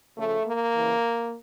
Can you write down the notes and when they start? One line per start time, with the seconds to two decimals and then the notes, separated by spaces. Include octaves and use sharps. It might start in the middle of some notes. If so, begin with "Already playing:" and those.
0.17 C#3 F3 A3
0.46 A#3
0.75 C#3 E3